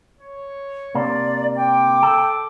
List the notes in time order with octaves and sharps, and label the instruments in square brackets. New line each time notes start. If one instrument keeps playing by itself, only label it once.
[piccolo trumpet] C#5
[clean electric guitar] C3 A#3 D4 [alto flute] D5
[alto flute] G5 [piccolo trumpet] D6
[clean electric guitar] A4